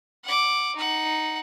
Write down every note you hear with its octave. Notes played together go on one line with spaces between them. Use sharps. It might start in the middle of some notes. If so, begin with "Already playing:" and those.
F#5 D6
D#4 F#5